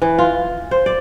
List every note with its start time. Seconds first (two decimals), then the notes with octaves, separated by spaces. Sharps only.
0.02 E3
0.18 F4
0.71 C5
0.86 D5